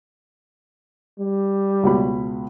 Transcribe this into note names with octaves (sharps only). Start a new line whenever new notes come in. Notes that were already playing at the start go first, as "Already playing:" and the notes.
G3
C#2 B2 B5